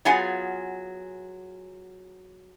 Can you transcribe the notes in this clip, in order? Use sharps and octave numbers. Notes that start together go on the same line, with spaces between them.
F#3 B3 F4 G#4 F#5 G#5